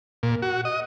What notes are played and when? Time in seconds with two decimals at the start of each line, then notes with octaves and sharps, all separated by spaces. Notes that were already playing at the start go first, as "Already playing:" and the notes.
0.23 A#2
0.42 F#4
0.65 D#5